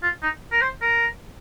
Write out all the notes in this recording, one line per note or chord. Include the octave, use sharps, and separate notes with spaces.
F4
D#4
A#4
C5
A#4